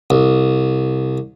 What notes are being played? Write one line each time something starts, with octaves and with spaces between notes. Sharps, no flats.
C2